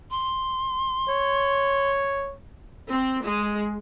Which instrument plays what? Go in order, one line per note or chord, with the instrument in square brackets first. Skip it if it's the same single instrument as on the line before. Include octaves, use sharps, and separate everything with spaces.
[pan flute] C6
[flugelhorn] C#5
[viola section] C4
G#3